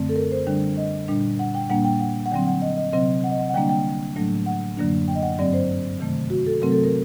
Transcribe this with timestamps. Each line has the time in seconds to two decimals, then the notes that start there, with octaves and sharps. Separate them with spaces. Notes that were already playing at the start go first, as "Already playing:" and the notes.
Already playing: F#2 D3 A3 C4
0.09 A4
0.16 A#4
0.32 C5
0.47 D3 G3 D4
0.77 D#5
1.08 A#2 G3 D4
1.39 F#5
1.55 G5
1.70 A#2 G3 A#3 D4 F#5
1.85 G5
2.00 F#5
2.26 F#5
2.31 D3 F#3 C4 G5
2.47 F#5
2.62 D#5
2.77 D#5
2.93 C3 F#3 C4 D#5
3.24 F#5
3.32 D#5
3.38 F#5
3.49 F#5
3.54 D3 G3 A#3 D4 G5
3.69 G5
4.16 A2 F#3 A3 D4
4.46 F#5
4.77 F#2 D3 F#3 A#3 D4
5.08 G5
5.15 D#5
5.23 F#5
5.39 G2 F#3 C4 D5
5.53 C5
6.00 C3 D#3 A3
6.30 F#4
6.46 A4
6.62 C3 F#3 A3 C4 A#4
6.72 A4
6.83 A#4